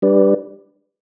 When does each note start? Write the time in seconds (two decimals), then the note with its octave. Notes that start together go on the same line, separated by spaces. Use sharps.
0.02 G3 D4 G4 B4 D5